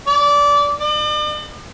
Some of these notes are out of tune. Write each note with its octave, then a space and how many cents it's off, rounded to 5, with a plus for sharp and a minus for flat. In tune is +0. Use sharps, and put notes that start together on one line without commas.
D5 -20
D5 +40